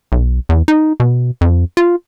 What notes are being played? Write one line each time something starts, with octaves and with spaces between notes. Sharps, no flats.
B1
E2
D#4
B2
F2
F4